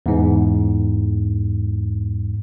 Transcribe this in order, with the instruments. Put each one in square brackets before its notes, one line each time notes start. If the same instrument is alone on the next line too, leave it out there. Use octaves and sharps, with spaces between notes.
[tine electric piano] E2 G#2